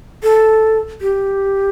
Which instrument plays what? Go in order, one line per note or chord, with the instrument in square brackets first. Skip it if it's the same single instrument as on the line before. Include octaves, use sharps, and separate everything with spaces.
[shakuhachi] A4
G4